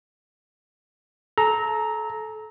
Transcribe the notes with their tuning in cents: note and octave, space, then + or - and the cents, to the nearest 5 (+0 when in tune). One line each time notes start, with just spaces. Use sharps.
A4 -30 A#5 +0